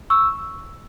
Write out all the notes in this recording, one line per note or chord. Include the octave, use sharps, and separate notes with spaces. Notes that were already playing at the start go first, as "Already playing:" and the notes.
C#6 E6